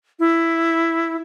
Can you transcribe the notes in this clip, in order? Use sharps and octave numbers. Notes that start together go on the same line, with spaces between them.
E4